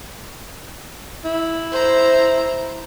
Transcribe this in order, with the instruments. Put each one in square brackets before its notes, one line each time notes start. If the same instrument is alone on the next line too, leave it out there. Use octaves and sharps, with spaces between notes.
[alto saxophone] E4
[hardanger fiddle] C5 A#5